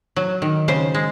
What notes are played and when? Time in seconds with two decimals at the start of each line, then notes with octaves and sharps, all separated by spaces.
0.16 F#3
0.42 D#3
0.68 C#3 C5
0.94 G#3